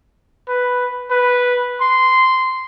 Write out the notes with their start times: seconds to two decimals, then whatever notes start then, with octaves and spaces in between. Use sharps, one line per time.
0.48 B4
1.10 B4
1.81 C6